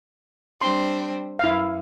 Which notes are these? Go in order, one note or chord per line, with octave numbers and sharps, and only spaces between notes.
G3 C4 D4 C6
F#2 E4 F5